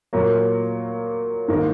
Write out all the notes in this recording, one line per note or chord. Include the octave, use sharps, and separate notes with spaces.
A#2 F#3 A#3
G#2 D#3 A#3